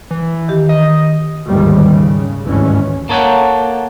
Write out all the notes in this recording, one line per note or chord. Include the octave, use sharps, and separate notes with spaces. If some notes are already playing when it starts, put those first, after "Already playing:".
E3
D#3 G4
D#5
G1 D#2 G#2 D#3 G3 A#3
C#3
G#1 D2 G2 E3 G#3 C#4
A#3 A4 C#5 D#5 F#5 G5